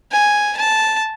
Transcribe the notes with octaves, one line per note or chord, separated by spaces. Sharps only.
G#5
A5